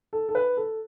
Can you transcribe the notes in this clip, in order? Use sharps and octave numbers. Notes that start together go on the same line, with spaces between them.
A4
A4
B4
A4